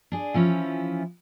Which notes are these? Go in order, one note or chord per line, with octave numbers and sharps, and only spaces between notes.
D4 G#4
E3 F3 C#4 E4 F4